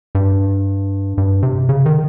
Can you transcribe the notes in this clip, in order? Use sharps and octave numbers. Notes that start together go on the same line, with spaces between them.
G2
G2
C3
C#3
D#3